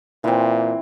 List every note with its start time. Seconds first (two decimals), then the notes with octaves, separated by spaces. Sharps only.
0.24 A#2 E3 C4